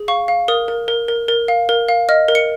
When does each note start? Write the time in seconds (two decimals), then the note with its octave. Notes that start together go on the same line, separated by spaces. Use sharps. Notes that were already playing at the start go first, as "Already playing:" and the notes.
Already playing: G#4
0.08 F5 C#6
0.28 F5
0.48 A#4 D#6
0.68 A#4
0.88 A#4
1.08 A#4
1.28 A#4
1.48 F5
1.69 A#4
1.89 F5
2.09 D#5 F6
2.28 A#4
2.35 C#7